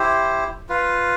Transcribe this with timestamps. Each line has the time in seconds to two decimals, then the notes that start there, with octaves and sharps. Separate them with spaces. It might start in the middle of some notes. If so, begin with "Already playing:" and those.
Already playing: E4 G4 C5
0.69 F4 B4 F5